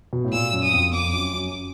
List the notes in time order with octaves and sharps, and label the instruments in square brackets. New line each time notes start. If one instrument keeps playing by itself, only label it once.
[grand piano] B2
A2
[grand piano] A#2 [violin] E6
[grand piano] F#2
[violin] D#6
[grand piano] F2
[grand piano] F2 [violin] D6
[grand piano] F#2
F#2